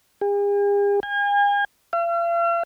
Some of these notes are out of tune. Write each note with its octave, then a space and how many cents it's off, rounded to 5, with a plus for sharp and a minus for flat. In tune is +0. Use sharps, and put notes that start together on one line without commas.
G#4 -45
G#5 -40
F5 -45